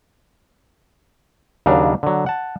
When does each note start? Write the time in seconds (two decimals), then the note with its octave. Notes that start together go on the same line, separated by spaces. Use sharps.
1.66 D#2 C#3 F#3 D4
2.03 D3 F#3
2.26 F#5 A5